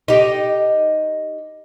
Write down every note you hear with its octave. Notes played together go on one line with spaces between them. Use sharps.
D#4 G4